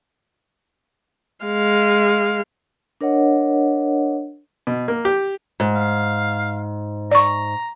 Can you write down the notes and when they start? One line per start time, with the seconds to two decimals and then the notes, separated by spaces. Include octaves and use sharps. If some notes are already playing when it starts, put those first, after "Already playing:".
1.45 G#3 F5
3.01 D4 A#4 C#5 D#5 F#5
4.67 B2
4.88 A#3
5.05 G4
5.60 G#2
5.75 F5
7.11 D5 A#5 C#6